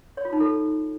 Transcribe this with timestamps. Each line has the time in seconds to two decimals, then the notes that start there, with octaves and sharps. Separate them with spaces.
0.17 C#5
0.25 F4
0.33 D#4
0.40 A4